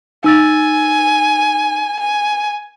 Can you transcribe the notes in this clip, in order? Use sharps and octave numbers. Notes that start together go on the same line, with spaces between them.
D#4 G#5 E6 A6
G#5